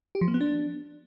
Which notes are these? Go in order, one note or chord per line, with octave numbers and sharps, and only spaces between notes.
G4
F3
A#3
B3
D4